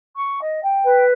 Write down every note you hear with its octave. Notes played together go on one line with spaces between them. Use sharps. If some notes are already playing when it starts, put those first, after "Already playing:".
C#6
D#5
G5
B4